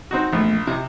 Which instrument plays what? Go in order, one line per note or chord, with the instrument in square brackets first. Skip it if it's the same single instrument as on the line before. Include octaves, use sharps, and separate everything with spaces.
[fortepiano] C4 D#4 F#4
[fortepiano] A#1 [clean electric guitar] E2 A3
[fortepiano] C3 [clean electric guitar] E4 D#5